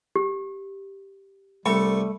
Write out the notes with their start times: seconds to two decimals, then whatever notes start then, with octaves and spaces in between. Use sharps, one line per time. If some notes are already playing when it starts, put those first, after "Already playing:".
0.16 G4
1.66 C2 G3 A3 A4 B5 C#6